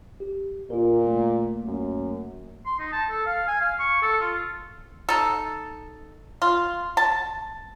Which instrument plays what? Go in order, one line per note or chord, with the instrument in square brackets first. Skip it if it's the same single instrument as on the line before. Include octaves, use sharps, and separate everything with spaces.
[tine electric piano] G4
[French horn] A#2 [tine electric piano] F4 A#4
[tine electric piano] A3 A#3
[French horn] F#2
[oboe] C6
D#4
A5
A4
F5
G#5
F5
C#6
A4
F4
[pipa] D#4 A4
F4
A5